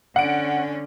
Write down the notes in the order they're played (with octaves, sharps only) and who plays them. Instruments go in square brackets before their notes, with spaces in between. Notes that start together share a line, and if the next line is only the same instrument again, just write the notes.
[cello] D3 C#4 [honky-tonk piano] F#5 D7